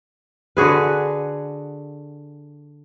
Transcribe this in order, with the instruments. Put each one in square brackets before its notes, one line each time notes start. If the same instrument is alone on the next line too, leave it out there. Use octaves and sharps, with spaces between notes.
[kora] D3 F#4 G#4 B4